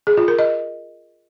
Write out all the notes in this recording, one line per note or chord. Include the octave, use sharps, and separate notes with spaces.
G#4
F4
A#4
D#5